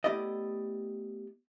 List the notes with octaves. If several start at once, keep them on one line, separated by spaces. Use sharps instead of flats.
A3 B3 E4 G4 D5 D#5